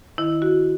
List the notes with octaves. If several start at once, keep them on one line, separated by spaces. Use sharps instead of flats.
D#3 E4
F#4